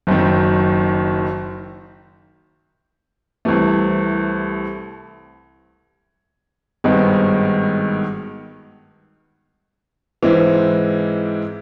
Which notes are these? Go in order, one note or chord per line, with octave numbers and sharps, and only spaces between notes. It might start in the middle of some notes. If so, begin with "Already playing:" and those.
F#1 F#2 D#3
C2 C3 E3 A3
G#1 G2 D#3 G#3 B3
G#2 E3 G#3 C4 E4